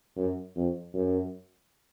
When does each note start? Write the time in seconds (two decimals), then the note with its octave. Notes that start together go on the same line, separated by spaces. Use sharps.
0.17 F#2
0.56 F2
0.94 F#2